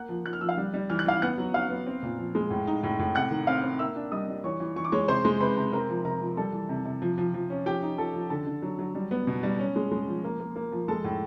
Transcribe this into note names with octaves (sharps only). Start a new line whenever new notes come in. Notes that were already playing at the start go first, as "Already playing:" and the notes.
Already playing: A#3 F#5 F#6
F3
F3 F#6
F6
F3 E6
F5 F6
G3
G3
E3 F6
F#6
E3 F5 F6
B3 F#5 F#6
F#3
F#3 F5 F6
B3
C4
A#2
F3
G#3
A2
D#4
A2
A2
C3 F#5 F#6
D#3
C4 F5 F6
C4
A#3 E5 E6
D4
G3 D#5 D#6
G3
E3 C#5 C#6
E3
E3 C#6
D6
G#3 C#5 C#6
C3 C5 C6
G#3
C3 B4 B5
C3
C4 A#4 A#5
F3
C3 A#4 A#5
F3
G3 A4 A5
E3
C3
C3
F3
F3
F3
C#4
F3 G4 G5
D#4
F3 A4 A5
F3
D3 A4 A5
D3
F#3
F#3
G3
B3
B2
G3
C#4
G#3
G#3
F3
A#3
A#3
A#3
F3
G#3 A4 A5
A2